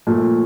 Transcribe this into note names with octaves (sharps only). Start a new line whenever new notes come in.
A#2 F3 A3